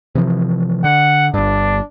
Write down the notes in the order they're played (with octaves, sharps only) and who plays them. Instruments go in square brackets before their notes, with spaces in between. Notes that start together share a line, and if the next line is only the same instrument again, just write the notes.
[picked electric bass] C3 E3 F3
[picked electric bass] D3 [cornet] F#5
[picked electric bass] G1 G2 [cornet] D4